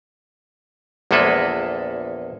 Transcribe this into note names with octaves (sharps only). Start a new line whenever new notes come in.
A#1 E2 G#3 A#3 A4 B4